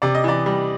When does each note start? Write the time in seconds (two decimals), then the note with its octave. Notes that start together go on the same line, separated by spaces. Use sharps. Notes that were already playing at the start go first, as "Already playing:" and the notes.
0.02 C3 D5
0.15 D#5
0.24 E3 D5
0.46 G3